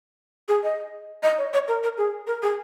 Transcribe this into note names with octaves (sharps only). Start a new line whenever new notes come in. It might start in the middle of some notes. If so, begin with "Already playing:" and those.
G#4
D#5
D#5
C#5
C#5
A#4
A#4
G#4
A#4
G#4